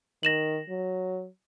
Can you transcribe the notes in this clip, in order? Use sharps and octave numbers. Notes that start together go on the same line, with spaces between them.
D#3 A#6 E7 F#7
F#3